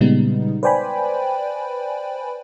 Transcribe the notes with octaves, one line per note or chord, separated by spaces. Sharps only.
A#2 C#3 G3 G#3 B3 D#4
B4 C5 D5 G5 G#5 B5